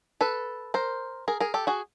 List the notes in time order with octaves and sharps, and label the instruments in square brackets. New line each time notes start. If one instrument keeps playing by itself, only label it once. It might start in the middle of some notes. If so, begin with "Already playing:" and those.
[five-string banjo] A4 B4
A#4 C5
G#4 A#4
G#4 A#4
G4 A4
F#4 G#4